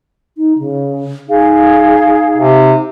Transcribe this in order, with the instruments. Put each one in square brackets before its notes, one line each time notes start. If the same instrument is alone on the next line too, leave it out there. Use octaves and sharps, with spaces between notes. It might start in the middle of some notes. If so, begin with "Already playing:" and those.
[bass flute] D#4
C#3
[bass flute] D#4 [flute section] G#4 F5
[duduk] C3